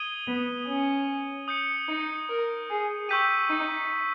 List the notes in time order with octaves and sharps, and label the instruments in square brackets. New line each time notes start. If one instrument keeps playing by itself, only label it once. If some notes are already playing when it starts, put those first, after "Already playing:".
Already playing: [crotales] D#6 G#6 D#7 G7
[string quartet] B3
C#4
[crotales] D#6 G6 C#7
[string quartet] D#4
A#4
G#4
[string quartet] G4 [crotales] C#6 E6 G6 B6 D#7
[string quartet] D#4